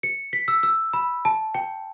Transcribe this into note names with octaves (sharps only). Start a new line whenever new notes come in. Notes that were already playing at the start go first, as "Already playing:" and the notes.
C#7
B6
E6
E6
B5
A5
G5